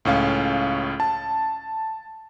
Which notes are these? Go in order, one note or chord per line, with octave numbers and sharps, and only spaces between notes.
C#2 A2 C#4 F5
A5